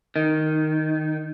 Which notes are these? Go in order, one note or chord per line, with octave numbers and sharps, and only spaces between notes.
D#3